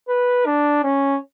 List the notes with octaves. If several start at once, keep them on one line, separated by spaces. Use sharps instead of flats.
B4
D4
C#4